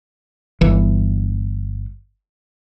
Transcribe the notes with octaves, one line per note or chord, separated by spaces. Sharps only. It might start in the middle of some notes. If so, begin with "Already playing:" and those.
G1 E3